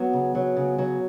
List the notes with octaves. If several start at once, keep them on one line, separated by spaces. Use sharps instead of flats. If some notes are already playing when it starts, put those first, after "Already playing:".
Already playing: F#3 B3
C#3
F#3
C#3
F#3